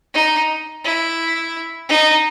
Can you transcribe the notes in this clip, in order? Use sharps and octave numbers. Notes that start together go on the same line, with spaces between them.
D#4
E4
D#4